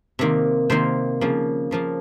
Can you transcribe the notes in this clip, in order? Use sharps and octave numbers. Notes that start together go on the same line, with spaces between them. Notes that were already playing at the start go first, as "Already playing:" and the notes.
C3 D#3 A#3
C3 D#3 A#3 C5
C#3 F3 A#3
C#3 F3 A#3